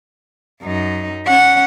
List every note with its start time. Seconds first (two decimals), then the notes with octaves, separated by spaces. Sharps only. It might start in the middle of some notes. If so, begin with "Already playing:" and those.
0.62 F#2 D#4
1.26 C#4 F#5